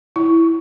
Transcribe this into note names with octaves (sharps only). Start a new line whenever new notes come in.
E4